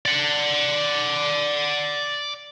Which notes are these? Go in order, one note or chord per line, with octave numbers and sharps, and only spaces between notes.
D5 F#5